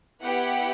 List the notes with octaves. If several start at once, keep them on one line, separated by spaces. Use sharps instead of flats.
B3 E4 G4 F#5